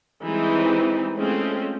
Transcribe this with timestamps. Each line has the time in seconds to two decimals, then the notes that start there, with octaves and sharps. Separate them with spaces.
0.22 E3 G3 G#3 C4 D#4
1.17 G#3 A3 C4 C#4 F4